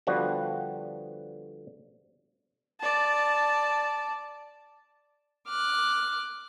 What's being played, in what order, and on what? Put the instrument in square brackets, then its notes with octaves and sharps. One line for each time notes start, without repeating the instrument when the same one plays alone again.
[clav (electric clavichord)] D3 F3 G3 B3 F#4
[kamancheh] D5 A5
[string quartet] D6 F6 F#6